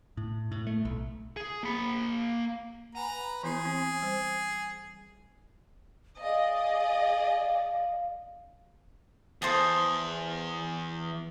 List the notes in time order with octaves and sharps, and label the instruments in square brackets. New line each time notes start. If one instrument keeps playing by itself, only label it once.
[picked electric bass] A2
A2
A3
B1
[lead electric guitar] G#4
A#3 B5
[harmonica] B4 A#5 [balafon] F#5 G#5
[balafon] E3 B3 E4 [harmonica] G#4
[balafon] E3 C4
G3 C5
[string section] G#4 D5 D#5 [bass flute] F5
[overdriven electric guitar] E2 [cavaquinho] C5 A5 D#6